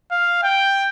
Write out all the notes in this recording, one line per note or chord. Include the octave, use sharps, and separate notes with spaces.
F5
G5